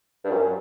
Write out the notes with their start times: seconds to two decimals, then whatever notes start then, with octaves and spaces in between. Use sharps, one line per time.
0.24 G2
0.31 F#2